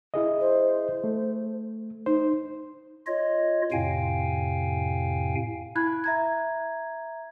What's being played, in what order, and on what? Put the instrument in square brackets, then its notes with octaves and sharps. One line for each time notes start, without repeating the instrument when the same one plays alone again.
[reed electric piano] E4 G#4 D#5
[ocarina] C5
[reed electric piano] A3
[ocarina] D#4 [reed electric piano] C5
[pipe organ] F4 C#5 D#5
F2 A2 C3 F5 G5 G#5
[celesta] E4 B5 F#6 G#6
E5 A#5 G#6